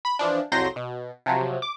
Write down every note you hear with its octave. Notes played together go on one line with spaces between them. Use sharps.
B5
E3 F3 D4
C2 F2 F#3 C6 G6 A#6
B2
C3 F3 F#3
D6